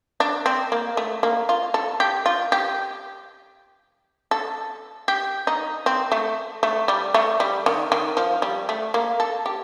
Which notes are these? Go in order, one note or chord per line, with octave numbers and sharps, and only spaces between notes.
D4
C4
A#3
A3
A#3
F4
A4
G4
F4
G4
A4
G4
D#4
C4
A3
A3
G3
A3
G3
D#3
D#3
F3
G3
A3
A#3
A4
G4